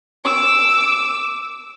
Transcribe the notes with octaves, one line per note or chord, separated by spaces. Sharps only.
D6 E6